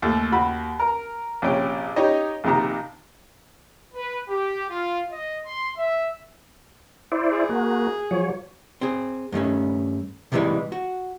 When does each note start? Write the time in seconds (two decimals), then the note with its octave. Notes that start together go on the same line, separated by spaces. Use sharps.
0.02 D#2 A3
0.32 D#2 F#4 B5
0.79 A#4 A#5
1.42 A#1 C3 C#4 G5
1.96 D#4 G4 C#5 D#5
2.44 A#1 C3 D#3 A#5
3.94 B4
4.29 G4
4.70 F4
5.11 D#5
5.46 C6
5.76 E5
7.12 E4 C5 D5
7.32 G#4
7.49 A#3 F#4
8.11 F3 F#3 C#5
8.81 C4 G#4
9.32 G2 D#3 A3 C#4
10.32 C3 D#3 E3 G3 G#3
10.72 F#4